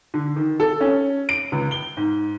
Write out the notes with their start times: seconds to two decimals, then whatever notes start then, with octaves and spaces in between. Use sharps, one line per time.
0.14 D3
0.36 D#3
0.60 A4
0.81 C#4
1.29 D7
1.52 C#2
1.71 G7
1.97 G#2